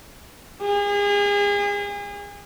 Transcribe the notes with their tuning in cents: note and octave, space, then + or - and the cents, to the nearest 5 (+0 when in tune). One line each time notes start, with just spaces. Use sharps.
G#4 -35